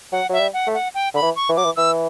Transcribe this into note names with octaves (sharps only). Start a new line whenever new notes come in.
F#3 F#5
F#3 E5
G3
F#5
A3
F#5
G5
D3 B5
E3
C#6
E3
F#3 D6
E3
E3 E6